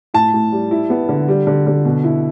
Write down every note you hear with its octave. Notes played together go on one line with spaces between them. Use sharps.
A2 A5
A2
G3
E4
B3
D3
G3
D3
D3
B2
E4